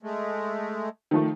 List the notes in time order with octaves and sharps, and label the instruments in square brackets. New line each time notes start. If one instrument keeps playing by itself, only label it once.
[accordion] G#3 A3
[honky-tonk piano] D#3 F3 A3